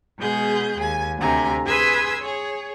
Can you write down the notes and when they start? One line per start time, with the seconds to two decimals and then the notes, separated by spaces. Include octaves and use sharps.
0.19 B2 G#3 G#4 G6
0.78 D#2 G#5
1.18 D2 C3 G#5 A#5
1.67 G#4 B4 G#5 C6 E6 G#6
2.22 G#4 C#5